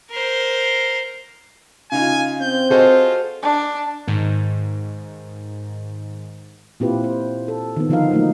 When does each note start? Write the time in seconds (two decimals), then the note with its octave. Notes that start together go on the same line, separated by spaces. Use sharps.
0.11 A#4 C5
1.92 C#3 D#4 F4 G#5
2.41 C4 G6
2.70 F4 F#4 G#4 A4 C5 D#5
3.42 D4
4.08 G#2 D#3
6.80 A#2 C4 E4 F4 G4 B4
7.04 C5
7.48 A4
7.77 D#3 B3
7.89 D3 F3 D#4 F4 A#4 F5
8.11 F3 F#3 A3 A#3 D#4